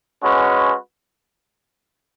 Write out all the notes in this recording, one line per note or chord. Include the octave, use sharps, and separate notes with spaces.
G#3 C#4 F#4 B4